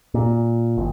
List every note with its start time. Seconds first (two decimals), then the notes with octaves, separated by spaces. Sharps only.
0.14 A#2
0.77 G#1